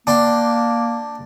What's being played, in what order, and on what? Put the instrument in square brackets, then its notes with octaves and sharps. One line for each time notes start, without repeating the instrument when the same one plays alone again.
[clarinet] A#3 [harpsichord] D4 G5 C6